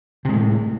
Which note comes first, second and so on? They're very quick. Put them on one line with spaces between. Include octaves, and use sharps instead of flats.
C3 G#3 A2